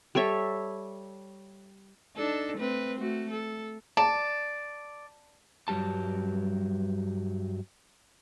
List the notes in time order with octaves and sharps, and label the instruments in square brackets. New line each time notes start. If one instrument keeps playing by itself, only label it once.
[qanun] G3 A4 C#5 E5
[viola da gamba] D4 D#4 A4
A3 C4 B4
A3 F#4
A4
[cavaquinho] D5 [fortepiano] A5
[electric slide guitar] G2 F#3 G3 G4 A5